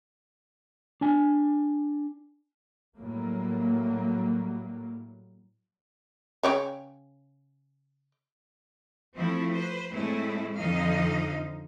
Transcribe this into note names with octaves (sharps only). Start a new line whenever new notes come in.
D4 G#5
A2 F#3 G3 A#3
C#3 C#5 G5
F3 A3 C4 E4
B4 C5
A2 G#3 A3 C4 E4
F2 D3 F3 D#4 D#5 F5